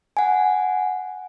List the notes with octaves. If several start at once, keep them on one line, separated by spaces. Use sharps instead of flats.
F#5 G#5